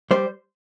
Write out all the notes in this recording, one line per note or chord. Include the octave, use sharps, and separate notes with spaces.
G3 C5